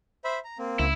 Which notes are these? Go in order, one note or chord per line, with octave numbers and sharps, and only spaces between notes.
C5 E5 B5
A#5
A#3 C4
C#2 E4